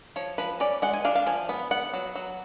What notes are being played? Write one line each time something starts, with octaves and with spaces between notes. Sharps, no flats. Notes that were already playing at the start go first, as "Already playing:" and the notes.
F3 C#5
F3 B4
C#4 D5
G#3 F#5
G#5
D4 F5
F5
F3 G#5
B3
B3 F#5
F#3
F#3